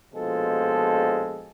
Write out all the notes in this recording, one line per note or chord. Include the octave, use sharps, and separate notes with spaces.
A#1 B2 F3 G#3 A4